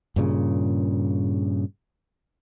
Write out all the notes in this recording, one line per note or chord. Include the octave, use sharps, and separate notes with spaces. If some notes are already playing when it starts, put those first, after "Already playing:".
G2 A#2 C#3